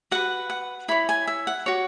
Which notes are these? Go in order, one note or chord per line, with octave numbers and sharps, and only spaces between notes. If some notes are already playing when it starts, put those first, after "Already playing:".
F#4 B4 F#5
F#5
E4 C#5 B5
G#5
E5
F#5
F#4 C#5